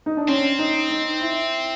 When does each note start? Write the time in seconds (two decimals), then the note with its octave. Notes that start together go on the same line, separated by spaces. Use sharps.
0.06 D#4
0.17 D4
0.28 C4 C#4
0.59 D#4
0.90 D#4
1.21 E4